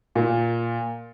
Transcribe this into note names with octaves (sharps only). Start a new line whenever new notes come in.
A#2